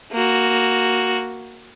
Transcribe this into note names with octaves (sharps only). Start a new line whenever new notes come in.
A#3 F#4